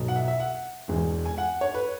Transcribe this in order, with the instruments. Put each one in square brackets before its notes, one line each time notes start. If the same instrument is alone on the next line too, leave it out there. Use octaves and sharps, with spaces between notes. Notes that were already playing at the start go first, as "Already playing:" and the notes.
Already playing: [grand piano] B1 B2 F#3
F#5
E5
E5
F#5
E1 E2 E3 G#3
G#5
F#5
C#5
B4